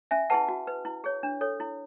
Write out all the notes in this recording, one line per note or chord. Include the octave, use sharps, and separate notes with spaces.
C#4 E5 G#5
E4 G#4 B4 F#5 A5
F#4
B4
E4
G#4 C#5
D4
A4 C#5
E4